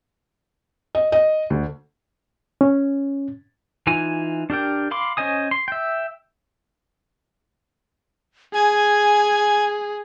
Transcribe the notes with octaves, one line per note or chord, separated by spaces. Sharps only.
D#5
D#5
D2
C#4
E3 D#4 F4 G#5
D4 G4 A#4 G5
F5 B5 C6 D6
C#4 C5 D#5 G#5 D#6
C6
E5 G5
G#4 G#5